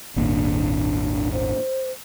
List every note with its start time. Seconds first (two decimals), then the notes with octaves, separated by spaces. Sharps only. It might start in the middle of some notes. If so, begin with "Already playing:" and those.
0.16 G#1 D#2 A#2 D4
1.32 C5